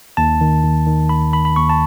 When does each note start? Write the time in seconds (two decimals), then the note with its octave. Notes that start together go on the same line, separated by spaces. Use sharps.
0.17 D#2 A5
0.41 D#3
0.64 D#2
0.87 D#3
1.09 D#2 B5
1.32 D#3 B5
1.45 B5
1.56 D#2 C#6
1.69 A5